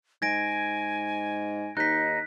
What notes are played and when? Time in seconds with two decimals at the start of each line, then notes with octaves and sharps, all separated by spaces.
0.22 G#2 G#5 G#6 A#6 D7
1.77 D#2 D#4 F#6 B6